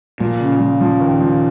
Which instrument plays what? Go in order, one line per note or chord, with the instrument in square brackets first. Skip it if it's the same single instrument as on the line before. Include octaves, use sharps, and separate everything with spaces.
[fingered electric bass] A#2 [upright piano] F3
[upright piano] C#3
F3
F3
D#2
F3